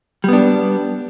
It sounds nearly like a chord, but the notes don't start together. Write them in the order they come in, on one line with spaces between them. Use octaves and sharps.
G3 B3 D4